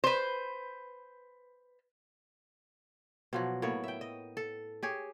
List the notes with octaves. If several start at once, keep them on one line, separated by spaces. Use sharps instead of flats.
B4 C5
B2 F3 F#3
A2 A#3 B3 C#5
E5 G5
D#5
A4
G4 G#4 C#5